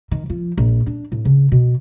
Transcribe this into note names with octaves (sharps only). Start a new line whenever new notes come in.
D#3
F3
A#1
D4
A2
C#3
B2